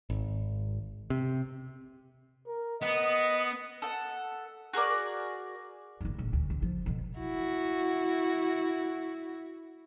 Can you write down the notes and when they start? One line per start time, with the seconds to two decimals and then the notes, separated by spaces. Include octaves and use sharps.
0.10 G#1
1.10 C3
2.47 A#4
2.82 B3 D#5
3.82 A4 F#5
4.73 F#4 G#4 A#4 D5
6.01 G1 A2
6.19 A#1 A2
6.33 D2
6.50 D3
6.62 F3
6.86 F2 B2
7.18 E4 F#4